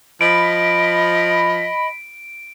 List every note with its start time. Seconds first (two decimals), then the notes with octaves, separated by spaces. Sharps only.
0.21 F3 D#5 B5 D7